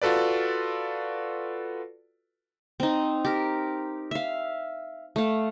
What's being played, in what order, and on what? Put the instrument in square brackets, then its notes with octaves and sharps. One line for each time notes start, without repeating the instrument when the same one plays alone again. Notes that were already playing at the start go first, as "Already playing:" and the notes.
[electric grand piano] F4 F#4 A4 B4 D5
[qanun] C4 D#4
G4 A#4
E5 F5
A3 F5